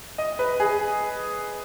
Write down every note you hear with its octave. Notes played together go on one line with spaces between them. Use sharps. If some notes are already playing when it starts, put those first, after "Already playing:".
D#5
B4
G#4